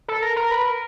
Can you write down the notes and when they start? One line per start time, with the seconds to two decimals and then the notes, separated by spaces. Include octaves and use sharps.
0.08 A4
0.22 A#4
0.36 A#4
0.51 B4
0.66 A#4